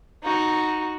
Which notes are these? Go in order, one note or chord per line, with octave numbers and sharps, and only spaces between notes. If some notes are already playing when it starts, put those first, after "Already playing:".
D#4 F#4